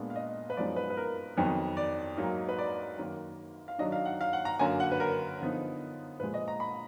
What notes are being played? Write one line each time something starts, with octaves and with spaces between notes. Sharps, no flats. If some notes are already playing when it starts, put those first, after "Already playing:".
Already playing: A#2 G#3 B3 D4
F5
D#5
B4
F#2 F3 G#3 B3 D#4 D5
B4
B4
A#4
F2 D#3 F#3 B3
D5
G#2 F#3 A#3 D#4
B4
D5
F#2 D#3 A#3
F5
D#3 F#3 D4 D#5
F5
F#5
F5
F#5
A#5
F#2 D3 F#3 A#3 G#5
F#5
B4
A#4
D3 F3 B3 D#4
A#2 F3 G#3 B4
D#5
A#5
B5